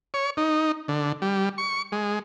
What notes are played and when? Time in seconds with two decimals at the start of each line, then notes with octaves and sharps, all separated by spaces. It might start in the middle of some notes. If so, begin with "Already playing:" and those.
0.14 C#5
0.37 D#4
0.88 D3
1.22 G3
1.58 C#6
1.92 G#3